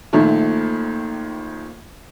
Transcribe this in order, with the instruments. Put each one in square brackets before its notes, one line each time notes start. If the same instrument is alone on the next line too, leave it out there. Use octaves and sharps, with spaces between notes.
[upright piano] A#1 A#2 D#3 A3